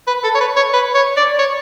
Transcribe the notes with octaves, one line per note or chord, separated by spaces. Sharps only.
B4
A4
C#5
B4
C#5
B4
C#5
D5
C#5